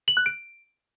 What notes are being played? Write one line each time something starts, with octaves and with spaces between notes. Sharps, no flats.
F#7
F#6
D7